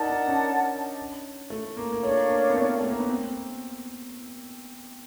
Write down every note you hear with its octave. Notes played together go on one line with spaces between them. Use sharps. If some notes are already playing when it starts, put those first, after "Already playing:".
Already playing: D#4 A#4 D5 F#5 A5
D4
C#4
A3
A#3
A#3
A3 D4 F4 A#4 C#5
A#3
B3
C4
A3
A#3
B3
C4